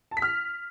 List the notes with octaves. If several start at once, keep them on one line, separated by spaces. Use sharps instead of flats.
A5
B6
F6